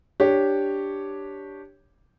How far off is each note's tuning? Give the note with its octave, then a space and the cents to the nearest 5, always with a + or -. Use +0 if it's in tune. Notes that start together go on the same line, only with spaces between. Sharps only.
D4 +0 G4 +0 C#5 +0